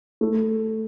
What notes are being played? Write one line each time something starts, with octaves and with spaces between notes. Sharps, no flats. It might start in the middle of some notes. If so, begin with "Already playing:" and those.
A3